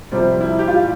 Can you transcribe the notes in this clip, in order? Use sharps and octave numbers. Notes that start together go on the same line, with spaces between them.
F2 C3 G3 C4
E4
G4
A2 E3 G3 F4